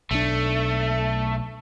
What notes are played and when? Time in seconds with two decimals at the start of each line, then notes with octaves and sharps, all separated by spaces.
0.11 B1 G3 A3 D4